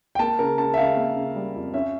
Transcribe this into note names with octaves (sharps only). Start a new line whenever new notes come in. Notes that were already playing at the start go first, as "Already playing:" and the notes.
G5
A#3 A5
C#3 A#4
C#3 A5
E5
C#3 F5
A#3
C#3
G3
F2
C#4 E5